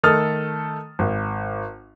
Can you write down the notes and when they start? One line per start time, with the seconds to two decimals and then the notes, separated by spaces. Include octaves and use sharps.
0.03 D#3 A3 A4 D#6 F6 A6
0.99 G#1